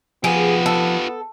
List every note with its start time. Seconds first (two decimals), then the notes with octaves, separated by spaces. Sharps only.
0.24 F3 B3 F4 G4 G#4
0.66 A4